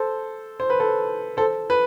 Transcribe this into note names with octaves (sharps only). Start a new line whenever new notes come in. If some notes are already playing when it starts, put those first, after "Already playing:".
Already playing: A4 C5
C5
B4
A4 C5
A4 C5
B4